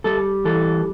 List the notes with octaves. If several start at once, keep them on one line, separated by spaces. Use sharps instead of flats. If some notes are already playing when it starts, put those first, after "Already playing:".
G3 A4
E3 A4